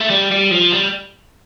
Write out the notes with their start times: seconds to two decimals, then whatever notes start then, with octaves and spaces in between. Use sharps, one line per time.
0.01 A3
0.11 G3
0.32 G3
0.51 F3
0.73 G3